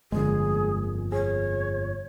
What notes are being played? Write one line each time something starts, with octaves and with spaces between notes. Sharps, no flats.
G1 F2 A#2 D3 G#3 G#4
G#4 C#5